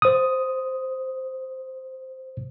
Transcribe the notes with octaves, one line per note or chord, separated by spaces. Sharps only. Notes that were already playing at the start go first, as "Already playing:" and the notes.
C5 D#6